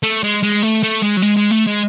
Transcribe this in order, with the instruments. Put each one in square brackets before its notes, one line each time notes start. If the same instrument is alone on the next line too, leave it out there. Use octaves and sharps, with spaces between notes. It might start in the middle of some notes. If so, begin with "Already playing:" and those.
[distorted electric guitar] A3
G#3
G#3
A3
A3
G#3
F#3
G#3
G#3
A3
G#3